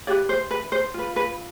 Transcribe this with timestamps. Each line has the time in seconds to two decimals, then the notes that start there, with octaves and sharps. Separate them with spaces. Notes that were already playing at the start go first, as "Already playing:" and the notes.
0.07 E4 G4 B4 D5
0.29 C5
0.51 B4
0.72 C5
0.94 F4 B4
1.16 B4